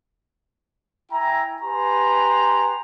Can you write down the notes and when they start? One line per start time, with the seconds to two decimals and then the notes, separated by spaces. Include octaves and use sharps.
1.12 E4 E5 G5 G#5 A#5
1.61 G4 B4 G#5 A#5 C6